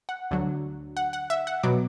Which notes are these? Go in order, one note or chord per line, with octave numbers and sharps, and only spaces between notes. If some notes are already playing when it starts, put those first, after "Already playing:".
F#5
D2 D3 F#3
F#5
F#5
E5
F#5
B2 F#3 D6